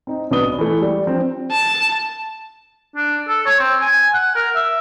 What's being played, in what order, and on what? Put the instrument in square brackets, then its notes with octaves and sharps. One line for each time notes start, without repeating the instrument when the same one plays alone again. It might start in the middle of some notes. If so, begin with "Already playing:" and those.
[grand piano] C4 D#4
B1 B3 D4 B4 D#6 G7
E3 A3
G3
F3 C4 D4 C5
[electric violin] A5
[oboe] D4
A4
C#5
C4
G#5
F#5
A#4
E5